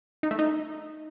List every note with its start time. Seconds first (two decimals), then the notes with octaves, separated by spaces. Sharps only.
0.23 D#4
0.31 A3
0.39 D#4